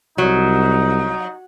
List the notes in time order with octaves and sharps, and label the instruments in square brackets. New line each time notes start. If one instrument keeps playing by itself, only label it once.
[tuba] C2 [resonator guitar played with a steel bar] F#3 [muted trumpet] D#4